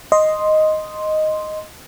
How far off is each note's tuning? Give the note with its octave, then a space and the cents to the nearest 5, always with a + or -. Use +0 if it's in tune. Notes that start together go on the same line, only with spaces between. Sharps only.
D#5 +0 C6 +0